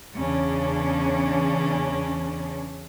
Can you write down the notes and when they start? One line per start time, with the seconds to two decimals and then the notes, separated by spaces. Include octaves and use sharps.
0.15 E2 C#3 C#4 D4